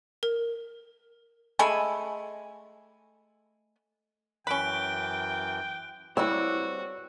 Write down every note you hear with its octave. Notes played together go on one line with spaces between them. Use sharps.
A#4
G#3 A3 G#5 B5
F#2 E3 C#4 G5 B5 F#6 D7 G7
G3 C4 E4 F#4 C#5 E6